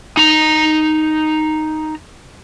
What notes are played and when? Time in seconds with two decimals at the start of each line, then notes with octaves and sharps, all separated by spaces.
0.17 D#4 A#5